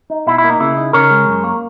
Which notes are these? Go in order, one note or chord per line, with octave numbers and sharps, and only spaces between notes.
D#4
B2 E4
E4
A#3
D#4
C#3 E4
D#4
C#3 A#4 C#5
G#3
F#2
A#3